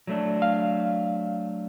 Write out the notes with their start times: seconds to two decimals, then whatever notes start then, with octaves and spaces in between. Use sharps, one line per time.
0.07 F#3 A3 D4
0.42 F5